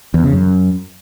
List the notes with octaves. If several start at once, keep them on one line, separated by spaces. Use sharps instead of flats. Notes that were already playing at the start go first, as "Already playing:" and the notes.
E2
C#3
F#2